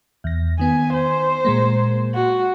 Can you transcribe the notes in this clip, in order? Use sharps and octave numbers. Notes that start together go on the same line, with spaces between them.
E2 A#6
D#3 B3 G#5
C5
A#2 G#3 A#3
F#4